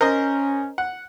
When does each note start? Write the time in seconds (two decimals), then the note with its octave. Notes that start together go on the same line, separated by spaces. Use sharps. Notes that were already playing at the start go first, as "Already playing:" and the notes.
0.01 C#4 A#4 C5 D#5
0.78 F#5